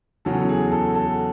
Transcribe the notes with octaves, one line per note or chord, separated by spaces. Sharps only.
E2 C#3 F#3 C#4 A4
G#4
A4
A4